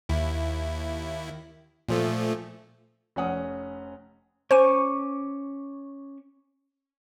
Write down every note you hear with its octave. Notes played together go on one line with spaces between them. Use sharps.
D#2 E4
A#2 F3 A3
F1 C#4 F#5 D#6
C#4 C5 G#5 C#6 D6 D#7